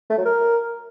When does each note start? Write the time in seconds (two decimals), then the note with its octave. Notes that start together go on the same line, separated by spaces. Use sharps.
0.10 A3
0.18 F#3
0.25 A#4